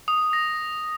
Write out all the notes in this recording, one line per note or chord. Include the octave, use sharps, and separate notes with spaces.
D#6
A#6